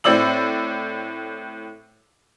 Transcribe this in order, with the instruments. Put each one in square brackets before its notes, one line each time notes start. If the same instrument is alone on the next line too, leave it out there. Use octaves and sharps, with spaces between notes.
[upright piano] A2 C4 D5 E6 F#7